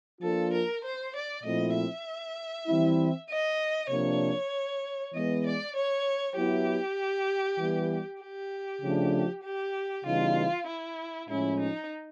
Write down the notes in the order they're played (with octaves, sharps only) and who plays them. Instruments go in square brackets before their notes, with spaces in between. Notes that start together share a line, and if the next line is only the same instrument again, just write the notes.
[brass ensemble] F3 A#3 D4 F4 [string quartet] A4
[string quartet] A#4
C5
D5
[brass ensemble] A#2 F3 A3 C4 E4 [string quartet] D#5
[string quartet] E5
[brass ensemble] E3 G3 C4 E4
[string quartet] D#5
[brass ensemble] C3 F3 A#3 D4 [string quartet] C#5
[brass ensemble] E3 G#3 B3 [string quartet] D#5
[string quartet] D5
C#5
[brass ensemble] F#3 B3 E4 [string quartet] G4
[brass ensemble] E3 G3 B3
[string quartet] G4
[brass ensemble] C#3 F3 A3 D4
[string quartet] G4
[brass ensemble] C#3 E3 G3 B3 D#4 [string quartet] F4
[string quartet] E4
[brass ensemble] A2 F3 G#3 C#4 [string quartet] E4
[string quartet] D#4